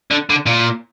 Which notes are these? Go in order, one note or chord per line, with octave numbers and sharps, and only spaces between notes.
D3
D3
A#2